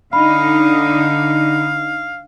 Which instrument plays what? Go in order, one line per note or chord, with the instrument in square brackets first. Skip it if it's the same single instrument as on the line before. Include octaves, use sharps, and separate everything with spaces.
[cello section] D3 D#4 [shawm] F5 [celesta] B5